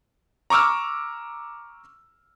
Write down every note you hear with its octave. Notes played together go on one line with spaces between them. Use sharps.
A#5 C#6 D6 E6 F6